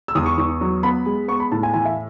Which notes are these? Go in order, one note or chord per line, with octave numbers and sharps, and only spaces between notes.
E6
E2 D#6
C#6
E2 C#6
F#3
B3 B5
G#3
B3 C#6
B5
A2 A5
G#5
E3 G#5
E5